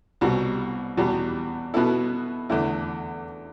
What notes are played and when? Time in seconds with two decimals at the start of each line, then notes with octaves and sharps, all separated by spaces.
0.21 C2 B2 G3
0.97 E2 B2 G3
1.74 B2 B3 E4 A4
2.50 E2 D3 A3 E4